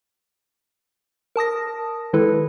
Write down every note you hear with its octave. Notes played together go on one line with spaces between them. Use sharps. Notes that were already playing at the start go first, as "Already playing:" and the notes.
A#4 A5 D#6 A#6
D#3 G#3 E4 A4 B4